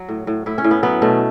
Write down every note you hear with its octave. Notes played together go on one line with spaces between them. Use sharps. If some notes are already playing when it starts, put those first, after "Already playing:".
Already playing: F#3 F#4
A2
A2
A2 E4
C#4
A2
B3
F#3 B3
B2 A3